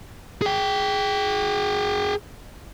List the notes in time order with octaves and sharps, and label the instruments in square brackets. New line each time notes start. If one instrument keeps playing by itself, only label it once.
[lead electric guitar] G#4 G5